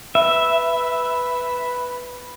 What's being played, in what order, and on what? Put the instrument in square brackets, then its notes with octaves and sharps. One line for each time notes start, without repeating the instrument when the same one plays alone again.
[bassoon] B4 [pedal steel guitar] E5